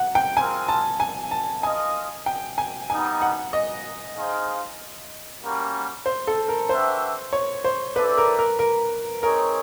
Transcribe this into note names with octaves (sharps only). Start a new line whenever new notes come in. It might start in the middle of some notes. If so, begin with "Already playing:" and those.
Already playing: F#5
G5
G#3 C4 F4 A#4 G#5
A5
G#5
A5
F4 A#4 D#5 G#5
G5
G#5
G3 B3 D#4 G#5
F#5
D#5
D#4 G#4 C5 F5
G3 A#3 C#4 F#4 A#4
C5
A4
A#4
D4 F#4 B4 C5 E5 G5
C#5
C5
C4 E4 A4 B4 D5
A#4
A#4
A#4
C4 D#4 G#4 A#4 C#5